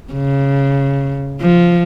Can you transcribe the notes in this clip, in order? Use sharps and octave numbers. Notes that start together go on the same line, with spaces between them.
C#3
F3